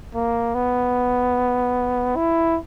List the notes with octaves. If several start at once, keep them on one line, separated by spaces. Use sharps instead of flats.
A#3
B3
E4